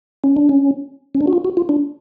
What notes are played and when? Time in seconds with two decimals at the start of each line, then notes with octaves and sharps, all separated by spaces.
0.24 C#4
0.37 D4
0.49 C#4
1.15 C#4
1.21 D4
1.27 F#4
1.33 F4
1.45 F#4
1.57 F4
1.69 D4